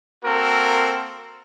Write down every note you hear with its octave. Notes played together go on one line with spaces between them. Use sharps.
A#3 C4 F#4 A4 A#4